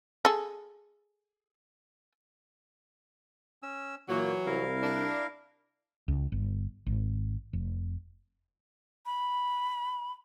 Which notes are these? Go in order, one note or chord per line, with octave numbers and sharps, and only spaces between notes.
G#4 A4
C#4 E6
A#2 E3 F#3 A#3 C#5
C2 E4 A#4 F5
D4
C#2
G1
G#1
F1
B5